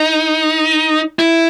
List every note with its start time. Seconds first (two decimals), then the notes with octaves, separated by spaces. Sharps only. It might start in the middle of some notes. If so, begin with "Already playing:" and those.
Already playing: D#4
1.19 E4